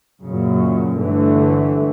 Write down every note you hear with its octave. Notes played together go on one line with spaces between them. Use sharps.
F#2 A#2 C#3
G1 D3 E3 A3